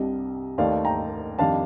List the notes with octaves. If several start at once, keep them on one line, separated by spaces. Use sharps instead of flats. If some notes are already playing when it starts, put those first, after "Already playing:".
Already playing: C2 C3 G3 D4 D#5
D#2 D#3 A3 D5 F5
G5 A#5
F2 D#3 G3 D4 F5 A5